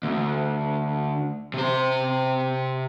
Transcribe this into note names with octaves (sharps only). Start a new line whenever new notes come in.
D2
C3 C5